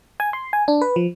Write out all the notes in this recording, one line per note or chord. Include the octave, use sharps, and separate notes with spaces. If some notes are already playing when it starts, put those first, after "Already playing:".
G#5
C6
G#5
D4
B4
F3